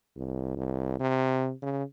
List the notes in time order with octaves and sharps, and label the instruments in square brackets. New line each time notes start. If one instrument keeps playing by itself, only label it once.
[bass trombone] C2
C2
C3
C#3